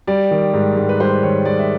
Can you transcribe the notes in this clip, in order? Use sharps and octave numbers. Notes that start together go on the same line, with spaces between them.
G3 D5
D#3
G#2
G#2
B4
G3 C5
D#3 C#5
G#2 D5
E5